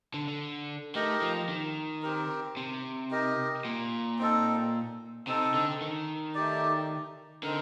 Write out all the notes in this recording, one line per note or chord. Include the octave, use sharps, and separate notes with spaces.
D3
D3
A3 D#4 G4 A#4 D#5
F3
D#3
C4 G4 A#4
C3
D#4 G4 A#4 D#5
A#2
C4 D#4 A4
C3 C4 D#4 A4
D3
D#3
A3 D#4 G4 D5
D3 C4 D#4 A#4